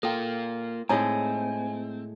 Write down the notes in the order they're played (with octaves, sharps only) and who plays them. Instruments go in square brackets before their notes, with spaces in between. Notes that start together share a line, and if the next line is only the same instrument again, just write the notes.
[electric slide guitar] A#3 F4 [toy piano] A4 G5
[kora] A2 G#3 A3 [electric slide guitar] C4 [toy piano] D#4 C#5 A#5 [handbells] G#5